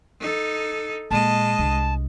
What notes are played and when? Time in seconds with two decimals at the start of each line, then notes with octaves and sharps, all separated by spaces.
0.20 D#4 A4
1.11 A#2 G#3 D#5 A5
1.59 C2 D4